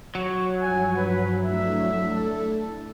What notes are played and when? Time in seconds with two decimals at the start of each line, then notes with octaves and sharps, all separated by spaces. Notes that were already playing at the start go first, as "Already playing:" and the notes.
0.15 F#3 C#5
0.62 G2 F3 G#5
0.96 B4
1.43 A3 D4 E4 E5
2.12 A4